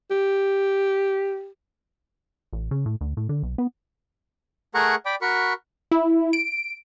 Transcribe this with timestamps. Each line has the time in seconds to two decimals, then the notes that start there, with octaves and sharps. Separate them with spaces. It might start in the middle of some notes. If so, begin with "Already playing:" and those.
0.11 G4
2.53 A1
2.71 C#3
2.86 A2
3.01 D2
3.17 A2
3.29 D3
3.43 B1
3.58 B3
4.74 A3 G#4 A#4 F#5 A#5 C#6
5.05 D5 G5 B5 D6
5.21 F#4 A#4 B5 C#6
5.91 E4
6.33 D7